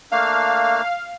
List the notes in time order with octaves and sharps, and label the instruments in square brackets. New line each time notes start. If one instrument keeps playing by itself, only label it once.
[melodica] A3 A#3 D4 [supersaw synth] F5